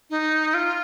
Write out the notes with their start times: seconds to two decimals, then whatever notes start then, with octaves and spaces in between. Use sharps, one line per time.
0.10 D#4
0.54 F4